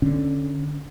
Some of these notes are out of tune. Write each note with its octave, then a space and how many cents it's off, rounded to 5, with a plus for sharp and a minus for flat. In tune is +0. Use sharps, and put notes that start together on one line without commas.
D3 +0 C#4 +0